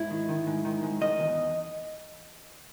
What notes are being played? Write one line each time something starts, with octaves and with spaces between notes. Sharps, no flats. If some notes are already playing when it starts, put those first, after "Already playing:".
Already playing: G#2 E4
D#3
D#3
G#2
D#3
G#2
D#3 D#5
E2